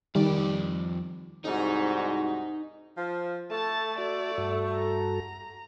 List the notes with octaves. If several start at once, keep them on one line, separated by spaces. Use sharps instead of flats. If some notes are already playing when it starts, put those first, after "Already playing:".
F2 D#3 G3 D5
C2 G#2 D#4 F#4
F3
A3 A5 A6
F#4 D5
G2 F#4 A4
A#5